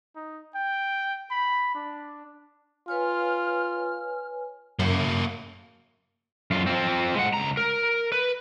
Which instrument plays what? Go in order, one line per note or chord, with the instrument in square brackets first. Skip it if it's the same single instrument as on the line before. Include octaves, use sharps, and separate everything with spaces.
[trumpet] D#4
G5
B5
D4
[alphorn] F4 [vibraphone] B4 C#5 G#5 [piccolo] F6
[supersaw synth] F#2 [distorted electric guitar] A#3 E4
[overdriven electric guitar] F#2 F4
C4 F4
G#3 F#5
C#2 A#5
A#4
B4